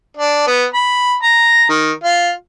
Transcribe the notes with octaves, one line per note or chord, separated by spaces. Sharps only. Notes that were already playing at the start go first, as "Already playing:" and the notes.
D4
B3
B5
A#5
D#3
F4